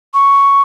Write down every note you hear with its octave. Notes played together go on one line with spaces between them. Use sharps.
C#6